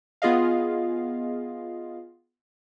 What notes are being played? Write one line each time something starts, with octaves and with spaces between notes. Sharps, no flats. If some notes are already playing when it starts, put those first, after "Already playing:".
B3 F4 G#4 D#5 F5